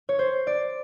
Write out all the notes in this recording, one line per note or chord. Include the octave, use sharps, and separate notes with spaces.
C#5
C5
D5